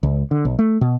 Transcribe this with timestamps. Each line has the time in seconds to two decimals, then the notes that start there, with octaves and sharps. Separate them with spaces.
0.03 C#2
0.31 D3
0.45 B1
0.59 A3
0.81 B2